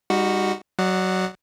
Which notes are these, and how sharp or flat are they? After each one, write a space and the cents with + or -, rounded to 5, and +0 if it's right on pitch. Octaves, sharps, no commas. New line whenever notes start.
G3 +30 D#4 +0 F#4 +0
F#3 +15 D5 +45 F#5 +0